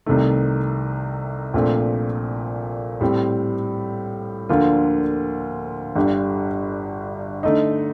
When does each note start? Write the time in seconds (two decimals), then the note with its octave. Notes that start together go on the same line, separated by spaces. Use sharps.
0.06 C2 C3 D#3 A3
1.53 A#1 A#2 A3 C4
3.01 A2 G3 C4
4.49 D2 D3 F3 A#3 F4
5.95 G1 G2 D3 G3
7.43 D3 A3 D#4